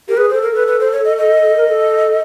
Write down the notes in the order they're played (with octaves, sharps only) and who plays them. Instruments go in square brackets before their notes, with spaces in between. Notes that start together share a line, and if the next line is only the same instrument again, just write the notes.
[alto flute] G4 [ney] A#4
[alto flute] G#4 [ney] B4
[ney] C5
[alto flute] A4
[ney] A#4
[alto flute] A4 [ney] B4
[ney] B4
C5
C#5
D#5
D#5
[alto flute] A#4
A4